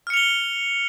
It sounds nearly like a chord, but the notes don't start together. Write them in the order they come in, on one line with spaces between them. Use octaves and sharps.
F6 C#7 F7 G7